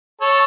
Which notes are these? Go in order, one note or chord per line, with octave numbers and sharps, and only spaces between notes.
A4 C#5